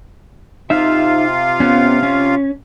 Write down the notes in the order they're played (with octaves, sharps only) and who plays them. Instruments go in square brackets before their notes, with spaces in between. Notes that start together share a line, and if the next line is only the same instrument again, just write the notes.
[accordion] C3 F4 F5 [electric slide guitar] D#4 E5
[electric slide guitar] B3 C#4
C#4